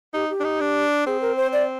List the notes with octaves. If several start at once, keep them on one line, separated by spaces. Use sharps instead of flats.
D#4 G4
G4
D4
D#4
D4
C4 G#4
A#4
C5
D5